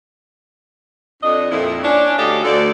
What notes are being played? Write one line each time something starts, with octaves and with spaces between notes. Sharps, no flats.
F2 D4 D#5
F2 A#2 E4
C#4 D4
D2 C#4 F4 G4 A4 D#5
D2 A4 D5